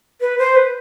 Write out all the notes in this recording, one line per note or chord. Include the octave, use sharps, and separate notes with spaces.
B4
C5
B4